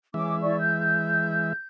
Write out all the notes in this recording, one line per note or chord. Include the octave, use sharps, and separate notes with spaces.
E3 G#3 C#4 E5 D6
E4 D5 C#6
G6